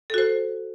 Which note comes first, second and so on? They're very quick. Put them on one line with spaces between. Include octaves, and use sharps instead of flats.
A4 F#4 C5